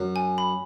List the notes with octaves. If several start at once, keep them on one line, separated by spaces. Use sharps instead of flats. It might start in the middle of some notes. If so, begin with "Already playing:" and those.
Already playing: F#2
G#5
B5